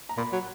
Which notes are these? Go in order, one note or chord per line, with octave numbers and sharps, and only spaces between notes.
A#5
A#2 B5
F#3